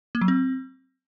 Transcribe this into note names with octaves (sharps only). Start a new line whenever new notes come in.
A#3
F#3
C4